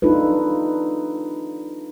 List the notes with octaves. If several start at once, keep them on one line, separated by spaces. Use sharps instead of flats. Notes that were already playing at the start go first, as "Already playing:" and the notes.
D4 D#4 F4 A4 B4